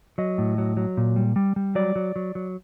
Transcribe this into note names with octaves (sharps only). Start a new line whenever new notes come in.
F#3 D#5
A2
F#3
F#3
A#2
G3
G3
G3
F#3 D5
F#3
F#3
F#3